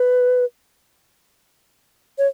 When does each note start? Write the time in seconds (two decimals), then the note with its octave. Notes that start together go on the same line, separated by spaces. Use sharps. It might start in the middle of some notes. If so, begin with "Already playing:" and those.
Already playing: B4
2.18 C#5